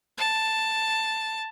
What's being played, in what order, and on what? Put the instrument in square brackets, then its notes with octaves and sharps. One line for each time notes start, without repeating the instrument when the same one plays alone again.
[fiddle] A5